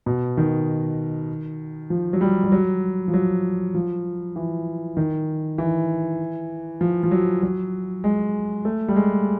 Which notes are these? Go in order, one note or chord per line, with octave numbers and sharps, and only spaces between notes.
B2
D#3
F3
F#3
G3
G3
F#3
F3
F#3
F3
E3
D#3
E3
F3
F3
F#3
F#3
G#3
A3
G3
G#3